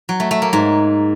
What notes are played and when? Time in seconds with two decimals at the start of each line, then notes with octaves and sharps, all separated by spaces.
0.09 F#3
0.20 A3
0.31 A3
0.42 A#3
0.53 G#2